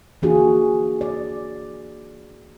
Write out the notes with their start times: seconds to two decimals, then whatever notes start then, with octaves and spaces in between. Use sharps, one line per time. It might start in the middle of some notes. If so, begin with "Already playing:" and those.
0.22 E3 A#3 D4 F4 F#4 G#4
1.01 D5